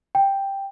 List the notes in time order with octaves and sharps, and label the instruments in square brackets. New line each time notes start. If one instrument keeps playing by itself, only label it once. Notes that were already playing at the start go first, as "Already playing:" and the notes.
[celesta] G5